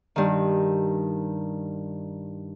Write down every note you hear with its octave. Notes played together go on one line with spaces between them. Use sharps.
G2 D#3